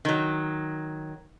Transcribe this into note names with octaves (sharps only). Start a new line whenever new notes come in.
D#3 F#3